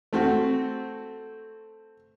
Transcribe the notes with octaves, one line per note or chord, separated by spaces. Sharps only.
A3 C4 F#4